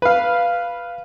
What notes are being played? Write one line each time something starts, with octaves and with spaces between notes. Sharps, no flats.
B4 F5